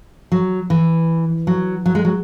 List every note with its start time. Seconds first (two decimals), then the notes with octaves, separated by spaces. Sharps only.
0.32 F#3
0.70 E3
1.47 F#3
1.86 F#3
1.95 G#3
2.05 F#3